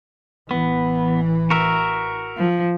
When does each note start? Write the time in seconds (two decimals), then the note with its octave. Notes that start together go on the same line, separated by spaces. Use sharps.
0.51 A1 E3 B3
1.50 F#4 A#4 E5
2.37 F3